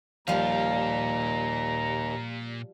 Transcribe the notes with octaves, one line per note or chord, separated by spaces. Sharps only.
D#2 A#2 F3 G3 F5 A#5